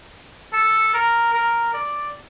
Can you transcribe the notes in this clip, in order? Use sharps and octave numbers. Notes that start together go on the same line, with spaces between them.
A4
A#4
A#4
D5